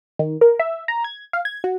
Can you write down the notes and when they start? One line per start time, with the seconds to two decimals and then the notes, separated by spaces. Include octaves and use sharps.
0.19 D#3
0.41 A#4
0.59 E5
0.88 A#5
1.04 G#6
1.33 F5
1.45 G#6
1.64 F#4